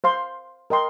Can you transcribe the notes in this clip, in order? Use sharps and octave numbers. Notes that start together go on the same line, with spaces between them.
C5 F5 C6
A#4 D#5 G5 C6